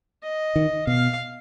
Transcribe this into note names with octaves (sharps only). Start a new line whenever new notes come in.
D#5
D#3
B2 F5